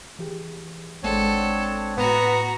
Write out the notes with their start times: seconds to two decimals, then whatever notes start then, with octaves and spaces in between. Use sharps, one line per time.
0.19 E3 G4 G#4
1.03 G#1 G#3 C4 D4 A4 C#5 F#5
1.97 A2 B3 F#4 A#5